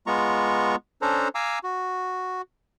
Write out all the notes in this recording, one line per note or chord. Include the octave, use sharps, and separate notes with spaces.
G#3 B3 F4 A#5 C#6
C#4 D4 A4 C5 A#5
F5 G#5 A#5 D6 E6
F#4